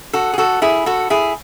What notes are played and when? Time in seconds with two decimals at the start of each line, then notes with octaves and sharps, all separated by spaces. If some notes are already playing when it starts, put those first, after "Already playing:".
0.13 F#4 A4
0.33 G#4
0.38 F#4 A4
0.62 E4 G#4
0.86 F#4 A4
1.10 E4 G#4